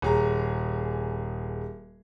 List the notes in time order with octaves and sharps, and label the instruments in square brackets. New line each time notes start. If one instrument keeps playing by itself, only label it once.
[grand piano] D#1 G#4 A#5